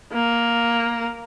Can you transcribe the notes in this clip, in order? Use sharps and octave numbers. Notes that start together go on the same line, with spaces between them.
A#3